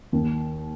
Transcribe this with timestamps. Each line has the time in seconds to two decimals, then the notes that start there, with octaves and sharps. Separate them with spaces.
0.13 D#2